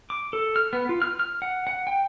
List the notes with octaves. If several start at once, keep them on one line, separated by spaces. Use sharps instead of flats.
D6
A4
F6
B3
F4
F6
F6
F#5
F#5
G5